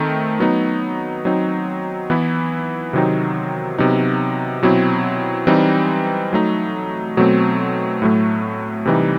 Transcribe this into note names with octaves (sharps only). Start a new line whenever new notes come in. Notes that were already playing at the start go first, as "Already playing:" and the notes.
Already playing: D#3 A3 C4 D#4
F#3 B3 D#4
F#3 C4 D#4
E3 B3 E4
C3 D#3 F#3 C4 D#4
C3 F#3 B3 D#4
B2 F#3 C4 E4
E3 G3 C4 D#4
F#3 A3 D#4
B2 F#3 A3 C4
A2 F#3 A3
C3 E3 G3 D#4